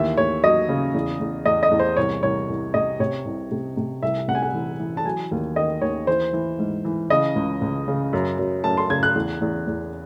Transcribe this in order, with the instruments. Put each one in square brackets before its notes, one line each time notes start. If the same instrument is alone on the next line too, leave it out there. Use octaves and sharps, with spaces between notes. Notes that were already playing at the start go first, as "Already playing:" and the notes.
Already playing: [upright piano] D#2 E3 E5
D#2 C#5
F#3 D#5
C#3
E2
E2
E2 D#5
D#5
E2
C5
C2 C#5
C2 C#5
C2
C3 D#5
C3 C#5
C2
C3
C3
C2 E5
C3 F#5
G#5
F#5
E3
E3
A5
F#3 G#5
D#2
D#3 D#5
D#2 C#5
E3 C5
E3
G#2
E3
C#3 D#5
C#2
C#2
C#3
F#2
F#2
F#2 A5
C6
C#3 G#6
F#6
E2
E2
E2